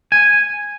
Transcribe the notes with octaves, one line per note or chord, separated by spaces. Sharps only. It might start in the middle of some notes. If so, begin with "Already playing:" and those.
G#5